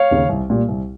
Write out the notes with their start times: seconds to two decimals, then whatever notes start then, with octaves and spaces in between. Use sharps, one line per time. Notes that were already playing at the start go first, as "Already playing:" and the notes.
Already playing: C#5 F5
0.11 D#2 C#3
0.29 C2
0.50 A#2 G3
0.69 C2